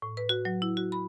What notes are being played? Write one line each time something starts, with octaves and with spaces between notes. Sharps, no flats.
A2
B4
F#4
F#3
E4
F#4
B5